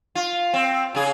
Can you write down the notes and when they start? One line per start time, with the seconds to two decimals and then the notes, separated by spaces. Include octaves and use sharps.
0.15 F4
0.54 C4
0.95 C#3 G#4